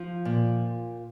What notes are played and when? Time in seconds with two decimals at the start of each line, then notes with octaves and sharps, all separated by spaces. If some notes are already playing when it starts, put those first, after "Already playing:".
Already playing: F3
0.25 A#2